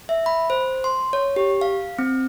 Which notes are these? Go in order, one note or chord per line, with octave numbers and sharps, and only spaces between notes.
E5
B5
C5
C6
C#5
G4
F5
C4